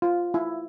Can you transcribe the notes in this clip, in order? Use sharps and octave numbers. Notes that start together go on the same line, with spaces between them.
F4
E4